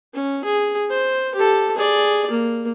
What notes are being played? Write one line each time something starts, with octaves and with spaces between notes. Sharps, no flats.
C#4
G#4
C5
G4 A4
G#4 D5
A#3